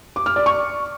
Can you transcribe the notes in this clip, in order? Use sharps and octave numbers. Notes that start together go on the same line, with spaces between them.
D6
F6
D5
C#6